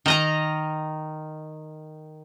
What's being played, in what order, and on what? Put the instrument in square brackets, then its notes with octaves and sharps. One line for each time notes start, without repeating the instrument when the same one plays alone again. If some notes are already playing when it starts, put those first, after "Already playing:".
[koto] D#3 D#5 A#5